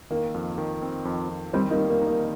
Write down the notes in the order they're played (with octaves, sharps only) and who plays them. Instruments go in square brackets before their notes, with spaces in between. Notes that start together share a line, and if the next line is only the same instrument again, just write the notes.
[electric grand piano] D#3 [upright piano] A#3
[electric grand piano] F2
D#3
C4
F2
F2
[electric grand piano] D#3 [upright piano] G3 C4
[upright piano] A#3 D#4
[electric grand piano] D#3
[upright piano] A#3
[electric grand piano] D#4
[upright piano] A#3